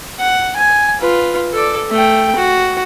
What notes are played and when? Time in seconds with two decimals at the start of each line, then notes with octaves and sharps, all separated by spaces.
0.20 F#5
0.56 G#5
1.00 F4 B4
1.53 A4 D5
1.90 A3 G5
2.36 F#4